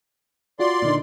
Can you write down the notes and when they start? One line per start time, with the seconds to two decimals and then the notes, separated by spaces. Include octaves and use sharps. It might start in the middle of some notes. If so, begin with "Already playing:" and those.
0.59 F4 F#4 D5 C6
0.82 A#2 D3 D#4